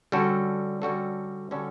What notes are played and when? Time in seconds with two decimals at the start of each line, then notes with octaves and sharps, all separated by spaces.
0.12 D3 G3 C#4 F#4 A4
0.82 D3 G3 C#4 F#4 A4
1.51 D3 G3 C#4 F#4 A4